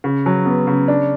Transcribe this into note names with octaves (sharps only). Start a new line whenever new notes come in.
C#3
F#3
B3
C#3
D4